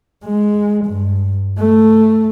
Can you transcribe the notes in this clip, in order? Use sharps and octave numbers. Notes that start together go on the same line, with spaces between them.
G#3
G2
A3